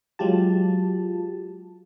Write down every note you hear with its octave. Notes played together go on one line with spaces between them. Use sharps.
F#3 G#3 F4 G4 A5